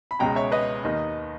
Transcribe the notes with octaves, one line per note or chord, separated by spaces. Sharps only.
B5
C#2 B2 G#3 C#4 G5 A#5
C#5 E5
B4 D#5
D#2 D#3 A#3 D#4